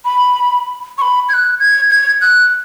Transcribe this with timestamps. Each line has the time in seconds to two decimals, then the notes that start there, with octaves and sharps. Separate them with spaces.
0.05 B5
0.98 C#6
1.02 B5
1.29 G#6
1.34 F#6
1.60 G#6
1.90 G#6
2.21 F#6